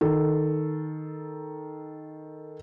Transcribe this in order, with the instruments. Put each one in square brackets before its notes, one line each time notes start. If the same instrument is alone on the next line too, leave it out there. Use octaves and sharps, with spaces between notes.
[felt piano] D#3 A4